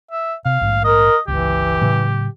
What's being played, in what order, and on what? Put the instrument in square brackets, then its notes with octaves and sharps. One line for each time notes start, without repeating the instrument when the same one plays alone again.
[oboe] E5
[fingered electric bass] C3 [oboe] F5
[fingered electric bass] A#1 G#2
[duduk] A#4 [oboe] D#5
[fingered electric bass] G1 C#2 [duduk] E3 [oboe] G4
[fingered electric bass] A2 C#3 F#3